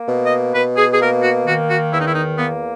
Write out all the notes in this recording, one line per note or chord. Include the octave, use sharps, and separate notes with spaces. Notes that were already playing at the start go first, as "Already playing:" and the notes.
Already playing: A#3
B2
D#5
B2 B4
G#4
G#4
A#3 A#4
F#4
D#3 F#4
F#4
E2 E4
D#4
E4
D#4
A#3 B3